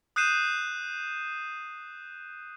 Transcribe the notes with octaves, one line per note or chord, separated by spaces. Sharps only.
D#6 F#6 G6 C7 D#7 E7